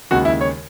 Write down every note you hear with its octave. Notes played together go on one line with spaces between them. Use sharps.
D#2 C#3 G#3 F#4
E4
C#5